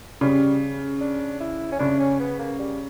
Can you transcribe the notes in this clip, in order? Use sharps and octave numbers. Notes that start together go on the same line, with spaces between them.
C#3 G3
D4
E4
C#4
C#3 D4
C#4
B3
A#3
G3